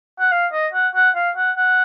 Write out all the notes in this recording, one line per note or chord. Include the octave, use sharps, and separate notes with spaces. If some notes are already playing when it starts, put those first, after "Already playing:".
F#5
F5
D#5
F#5
F#5
F5
F#5
F#5